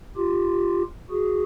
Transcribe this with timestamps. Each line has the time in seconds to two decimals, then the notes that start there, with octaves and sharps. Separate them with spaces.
0.17 F4 G4
1.10 F#4 G#4